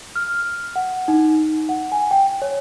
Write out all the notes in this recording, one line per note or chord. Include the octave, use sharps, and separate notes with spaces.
F6
F#5
D#4
F#5
G#5
G5
C#5